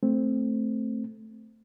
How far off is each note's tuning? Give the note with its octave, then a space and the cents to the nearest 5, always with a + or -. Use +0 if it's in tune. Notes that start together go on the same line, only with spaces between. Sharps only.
A3 +0 C4 +0